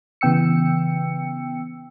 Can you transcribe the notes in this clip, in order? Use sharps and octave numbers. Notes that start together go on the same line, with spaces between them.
C#3 E3 B3 G5 E6 C#7